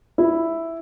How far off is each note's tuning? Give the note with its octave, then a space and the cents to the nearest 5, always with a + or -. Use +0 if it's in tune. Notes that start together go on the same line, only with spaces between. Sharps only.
E4 +0